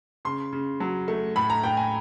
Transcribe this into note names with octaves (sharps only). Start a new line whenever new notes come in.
C#3 C6
C#3
F#3
A3
A2 B5
A#5
A2 G5
G#5